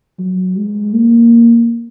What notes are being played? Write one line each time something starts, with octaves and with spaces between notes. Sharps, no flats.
F#3
G#3
A#3